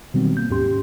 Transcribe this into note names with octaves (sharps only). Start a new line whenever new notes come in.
B2 D#3 F#3 G3 B3 C4
A#3 G6
D#2 G#2 C#4 G4 C6